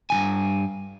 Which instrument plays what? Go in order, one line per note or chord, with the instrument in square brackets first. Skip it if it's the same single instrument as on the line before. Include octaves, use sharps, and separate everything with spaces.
[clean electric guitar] G2 D#3 G#5